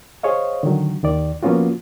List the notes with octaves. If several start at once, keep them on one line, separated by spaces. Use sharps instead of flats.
G#4 C5 C#5 D#5 F5
D3 D#3 F#3
D#2 D#3 D5
F3 A#3 B3 C#4 F4 F#4